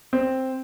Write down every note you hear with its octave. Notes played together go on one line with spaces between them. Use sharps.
C4